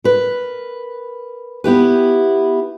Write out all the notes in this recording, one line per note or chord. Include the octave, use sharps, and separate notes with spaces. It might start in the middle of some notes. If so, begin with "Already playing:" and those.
A#4 B4
B3 E4 G4 B4